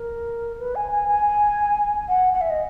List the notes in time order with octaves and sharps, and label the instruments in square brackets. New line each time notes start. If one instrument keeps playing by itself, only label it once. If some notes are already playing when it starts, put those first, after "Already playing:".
Already playing: [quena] A#4
B4
G#5
G#5
G#5
F#5
F#5
E5
D#5